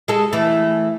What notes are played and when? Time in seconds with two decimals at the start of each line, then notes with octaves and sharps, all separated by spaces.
0.08 G#3 A4
0.33 E3 A3